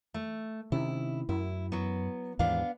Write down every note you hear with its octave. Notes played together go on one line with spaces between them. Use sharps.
A3
C3 D#3 C#4 E4
F#2 E4
F#3 B3
D#2 G#2 E3 B3 D4 F5